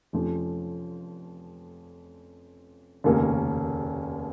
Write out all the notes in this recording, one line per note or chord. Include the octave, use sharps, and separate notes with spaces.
F1 F2 F3 C#4
F1 D#2 C#3 A#3 C#4